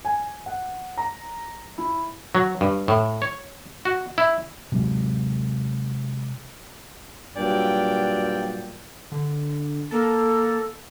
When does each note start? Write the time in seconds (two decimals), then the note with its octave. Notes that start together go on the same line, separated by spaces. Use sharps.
0.05 G#5
0.46 F#5
0.98 A#5
1.78 E4
2.35 F#3
2.61 G2
2.88 A2
3.22 C#5
3.85 F#4
4.18 E4
4.72 C3 F#3 G#3
7.37 G2 A#2 F#3 D5 G5
9.12 D3
9.91 A#3 A4 A5